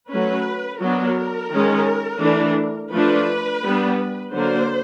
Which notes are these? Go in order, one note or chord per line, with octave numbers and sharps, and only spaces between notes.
F#3 A3 C#4 B4
F#3 B3 D4 A#4
D#3 G#3 C#4
E3 A3 D4
F3 A3 D4 B4
G3 B3 D4
D3 F#3 A#3 D4 C5